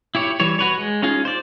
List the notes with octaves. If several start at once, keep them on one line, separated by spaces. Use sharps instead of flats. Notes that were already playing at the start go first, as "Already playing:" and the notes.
E4 G4 C#5
E3 G3 C#5
F#4 B4 C#5
G#3
C#4 D#4 F4 G#4
C5 D5